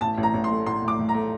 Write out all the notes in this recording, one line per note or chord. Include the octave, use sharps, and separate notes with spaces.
A1 A5
A1
A#5
A1
C6
A3
A2 C6
A2
D6
A2
A#5
A3